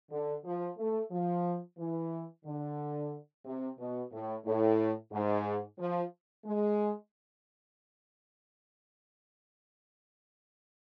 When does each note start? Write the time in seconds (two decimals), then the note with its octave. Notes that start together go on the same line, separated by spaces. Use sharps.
0.10 D3
0.44 F3
0.77 A3
1.11 F3
1.78 E3
2.45 D3
3.45 C3
3.78 B2
4.12 A2
4.45 A2
5.12 G#2
5.79 F3
6.45 G#3